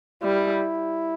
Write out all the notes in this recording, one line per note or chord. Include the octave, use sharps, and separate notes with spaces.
G3 E4